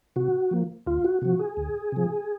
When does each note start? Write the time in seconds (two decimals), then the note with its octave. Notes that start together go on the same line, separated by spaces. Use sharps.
0.16 C3 F#4
0.51 F3 A#3
0.86 D2 F4
1.04 F#4
1.21 C3 F3 F#4
1.39 G#4
1.57 D2
1.92 C3 F3